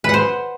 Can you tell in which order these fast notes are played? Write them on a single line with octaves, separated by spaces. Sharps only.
B4 F#5 C5